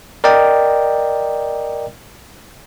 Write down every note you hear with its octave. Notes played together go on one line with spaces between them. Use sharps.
A#4 D5 D#5 G5